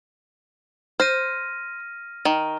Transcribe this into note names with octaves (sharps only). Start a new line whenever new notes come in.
C5 F6 A#6 D#7
D#3